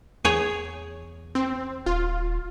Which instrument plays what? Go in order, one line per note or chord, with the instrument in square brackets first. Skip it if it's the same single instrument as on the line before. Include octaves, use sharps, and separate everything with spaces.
[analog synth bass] E2 [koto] G#4 C#5
[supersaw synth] C4
[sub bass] D#1 [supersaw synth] F4